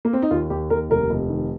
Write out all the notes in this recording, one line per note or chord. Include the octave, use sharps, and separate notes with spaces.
A#3
C4
D#4
D#2 F4
D#2 G4
D#2 A#4
F1 A#4
F1
D#3